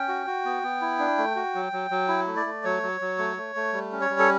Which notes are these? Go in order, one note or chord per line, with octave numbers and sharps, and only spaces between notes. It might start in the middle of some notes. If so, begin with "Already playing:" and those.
Already playing: C#4 G5
F#4
F#4
B3
B3
E4
D4
A3
F#4
F#3
F#3
F#3
E4
A3
D5
A3
F#3 C#5
F#3
F#3
A3
A3
A3
G3
C#4
C#5
G3
A4